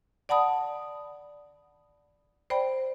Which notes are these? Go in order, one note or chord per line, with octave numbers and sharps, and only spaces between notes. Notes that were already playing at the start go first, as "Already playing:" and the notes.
D5 F#5 A5 B5 D#6
C5 D5 G5 B5